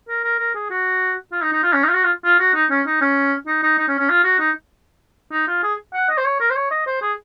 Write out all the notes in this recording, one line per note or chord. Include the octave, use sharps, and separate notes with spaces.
A#4
A#4
A#4
G#4
F#4
F4
D#4
D#4
F4
C#4
D#4
F4
F#4
F4
F4
F#4
D#4
C#4
D#4
C#4
D#4
D#4
D#4
C#4
C#4
F4
F#4
D#4
D#4
F4
G#4
F#5
D#5
C5
C#5
A#4
C5
C#5
D#5
C5
G#4